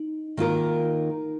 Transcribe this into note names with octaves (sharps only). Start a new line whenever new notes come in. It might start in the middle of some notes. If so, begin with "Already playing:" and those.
Already playing: D#4
D#3 A#3 F4 A#4